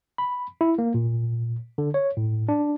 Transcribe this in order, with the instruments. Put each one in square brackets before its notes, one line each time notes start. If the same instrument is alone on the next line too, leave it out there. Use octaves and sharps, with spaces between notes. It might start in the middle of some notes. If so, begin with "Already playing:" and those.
[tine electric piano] B5
E4
A#3
A#2
D3
C#5
A2
D4